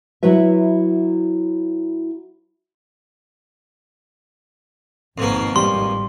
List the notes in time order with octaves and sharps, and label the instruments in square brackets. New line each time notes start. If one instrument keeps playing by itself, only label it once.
[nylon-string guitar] F#3 E4 F#4 B4 E5
[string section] G#1 [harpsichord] F2 B2 A#3
[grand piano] G3 [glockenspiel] C6